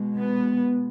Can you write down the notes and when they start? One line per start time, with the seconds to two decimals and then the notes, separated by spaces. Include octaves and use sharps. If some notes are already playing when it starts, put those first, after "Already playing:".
Already playing: B2 G#3
0.17 B3